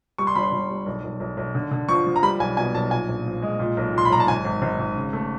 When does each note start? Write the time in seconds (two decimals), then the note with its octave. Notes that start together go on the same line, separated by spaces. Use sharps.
0.18 G3 C#6
0.27 C6
0.35 G1 B5
0.43 C6
0.52 G1
0.70 G3
0.86 B1
1.03 B1
1.20 B1
1.37 B1
1.55 D3
1.71 D3
1.89 F3 C#6
2.07 F3
2.16 A#5
2.23 G3 B5
2.40 B1 G#5
2.57 B2 G#5
2.74 B1 A5
2.91 A#2 G#5
3.08 A#1
3.26 F3
3.42 G#3
3.59 A#2
3.77 B1
3.93 A#2 C6
4.05 B5
4.10 B1 A#5
4.20 A5
4.27 G#1 G#5
4.45 G#1
4.62 G#1
4.79 G#1
4.95 C#3
5.13 A3